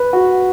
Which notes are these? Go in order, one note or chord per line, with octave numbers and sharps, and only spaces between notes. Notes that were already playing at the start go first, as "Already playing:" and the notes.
Already playing: B4
F#4